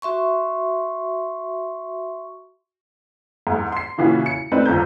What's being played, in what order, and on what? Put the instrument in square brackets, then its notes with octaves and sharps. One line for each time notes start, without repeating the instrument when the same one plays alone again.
[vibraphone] F#4 E5 C6 C#6
[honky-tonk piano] E2 G#2
C6 C7
A#2 C#3 E3 C#4 E4 F#4
C#7
A3 C4 D#4 B4 D5
G1 F2 A#5 G6